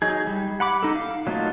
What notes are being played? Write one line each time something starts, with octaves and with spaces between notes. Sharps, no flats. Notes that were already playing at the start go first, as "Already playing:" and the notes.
F#3 D#4 G#4
G3
F#5 B5 D6
D#4 A4
F5
F#3 A3 A#3 D#4 F4